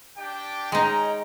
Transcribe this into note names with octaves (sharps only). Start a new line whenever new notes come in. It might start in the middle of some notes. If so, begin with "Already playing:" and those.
D4 G4 G5
G#3 C#4 D#4 G5 A#5